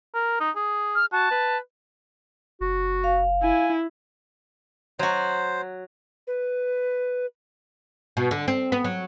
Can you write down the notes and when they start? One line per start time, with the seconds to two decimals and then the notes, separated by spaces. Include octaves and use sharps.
0.14 A#4
0.40 D#4
0.56 G#4
0.95 F6
1.12 F#4 A5
1.31 B4
2.61 F#1 F#4
3.04 F5
3.43 E4 G#5
4.99 F#3 F#4 C5
6.27 B4
8.17 B2
8.31 D3
8.48 C4
8.72 B3
8.84 F#3